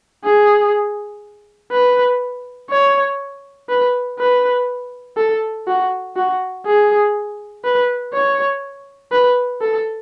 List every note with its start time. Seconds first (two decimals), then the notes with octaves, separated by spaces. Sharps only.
0.24 G#4
1.72 B4
2.70 C#5
3.69 B4
4.19 B4
5.17 A4
5.67 F#4
6.16 F#4
6.66 G#4
7.64 B4
8.13 C#5
9.12 B4
9.61 A4